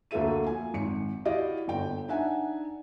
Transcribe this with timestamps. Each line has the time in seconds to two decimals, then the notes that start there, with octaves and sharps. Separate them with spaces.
0.11 D2 A#3 F#4 A4 E5 D#7
0.46 F3 G#5
0.74 G#1 C#7
1.25 E4 F#4 G4 D5 D#5 F5
1.68 G1 G5
2.08 D4 D#4 E5 F#5 G#5